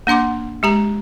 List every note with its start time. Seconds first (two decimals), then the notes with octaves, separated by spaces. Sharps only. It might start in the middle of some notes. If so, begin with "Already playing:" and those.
0.07 A#3 D4 F#5 C6 D6
0.63 G#3 G4 A#5